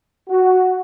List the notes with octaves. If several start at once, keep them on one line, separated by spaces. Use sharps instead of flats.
F#4